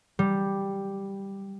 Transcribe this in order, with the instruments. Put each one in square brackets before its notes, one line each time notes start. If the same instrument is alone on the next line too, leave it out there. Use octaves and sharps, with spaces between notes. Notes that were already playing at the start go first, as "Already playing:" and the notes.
[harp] G3